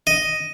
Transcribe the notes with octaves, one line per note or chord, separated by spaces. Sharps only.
D#5